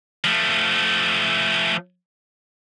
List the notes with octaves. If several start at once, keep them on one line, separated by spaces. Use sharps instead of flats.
F3 A3